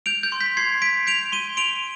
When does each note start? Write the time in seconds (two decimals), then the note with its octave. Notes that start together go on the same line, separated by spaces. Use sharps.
0.06 G6 D7 F7
0.23 G6
0.32 C6
0.40 G6 B6
0.57 C6 G#6 C7
0.82 G6 B6 D7
1.07 G6 D7 F7
1.32 C6 D#7 G7
1.57 C6 D7 F7